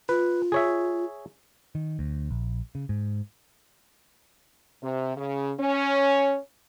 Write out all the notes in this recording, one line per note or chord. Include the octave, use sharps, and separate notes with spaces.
F4 B4
G#4 C#5 E5
D#3
D2
A#1
C#3
G#2
C3
C#3
C#4